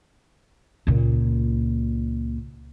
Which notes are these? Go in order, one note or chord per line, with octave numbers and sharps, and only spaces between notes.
C#2 A#2